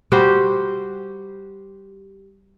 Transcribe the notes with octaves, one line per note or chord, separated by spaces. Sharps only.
G3 F#4 G4 C5